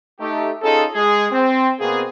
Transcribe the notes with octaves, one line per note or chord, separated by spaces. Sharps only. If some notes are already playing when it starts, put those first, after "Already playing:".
A3 D#4 G4
C#4 D#4 F4 G#4 A4
G#3 G#4
C4
B2 A#3 C4 G#4